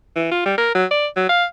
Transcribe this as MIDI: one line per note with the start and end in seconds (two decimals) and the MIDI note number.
0.16 0.27 52
0.31 0.41 65
0.46 0.56 55
0.58 0.74 70
0.75 0.85 54
0.91 1.07 74
1.16 1.29 54
1.29 1.44 77